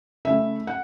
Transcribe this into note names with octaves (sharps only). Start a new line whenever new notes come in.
C#3 A3 E4 E5
F#5